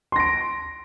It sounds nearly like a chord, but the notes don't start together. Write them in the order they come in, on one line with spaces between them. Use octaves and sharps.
C6 A#6 D7